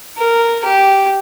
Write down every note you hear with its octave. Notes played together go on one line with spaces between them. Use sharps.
A#4
G4